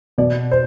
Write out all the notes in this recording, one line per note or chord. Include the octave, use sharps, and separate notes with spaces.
B2 D5
C5